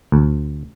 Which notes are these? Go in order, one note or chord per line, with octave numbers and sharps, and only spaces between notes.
D2